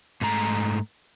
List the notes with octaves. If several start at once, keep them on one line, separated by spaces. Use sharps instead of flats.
G#2 A3 A#5